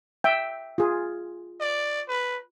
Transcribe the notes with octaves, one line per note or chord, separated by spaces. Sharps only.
E5 G5
F4 G#4
D5
B4